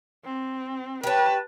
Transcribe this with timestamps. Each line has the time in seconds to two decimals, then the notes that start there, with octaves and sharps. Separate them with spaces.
0.25 C4
1.03 G4 B4 C#5 A5